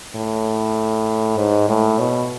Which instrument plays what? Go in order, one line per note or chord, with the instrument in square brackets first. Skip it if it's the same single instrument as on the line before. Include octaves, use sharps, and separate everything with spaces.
[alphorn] A2
G#2
A2
B2